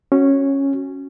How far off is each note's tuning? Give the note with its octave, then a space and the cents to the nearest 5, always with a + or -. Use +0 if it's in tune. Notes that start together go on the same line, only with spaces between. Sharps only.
C#4 -10 F#4 +0